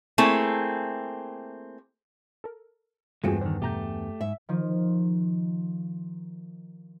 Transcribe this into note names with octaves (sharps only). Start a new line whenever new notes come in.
A3 A#3 C4 E4 G#4
A4 A#4
E2 G2 G#3 A3 C4 F4 F#4 G#4
D3 D#3 C5
B2 A3 G4 A#5 G6
G#2 E5
D#3 F3